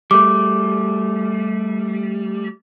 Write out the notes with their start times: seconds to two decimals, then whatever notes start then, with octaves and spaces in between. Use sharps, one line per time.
0.11 G3 A3 D6